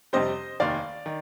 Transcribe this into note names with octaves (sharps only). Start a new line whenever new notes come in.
F2 C3 G3 C5 D#5
F1 D#2 D#3 D5 F5
D#3